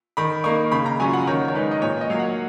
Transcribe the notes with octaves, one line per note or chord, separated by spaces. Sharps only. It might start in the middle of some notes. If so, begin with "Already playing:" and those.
D#3 B5
A#3 D#4 C#6
C#3 B5
A#5
F#3 C#4 F4 G#5
F#5
D#3 C#5
C#5
G#3 D#4 B4
D#5
A#2 C#5
D#5
F#3 A#3 F5
F#5